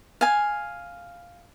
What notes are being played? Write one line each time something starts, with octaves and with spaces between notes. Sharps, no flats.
F5 G#5